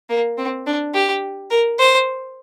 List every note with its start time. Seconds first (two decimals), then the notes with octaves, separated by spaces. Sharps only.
0.10 A#3
0.38 C4
0.67 D4
0.94 G4
1.51 A#4
1.79 C5